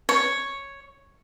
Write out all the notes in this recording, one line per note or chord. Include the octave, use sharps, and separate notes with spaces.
C#5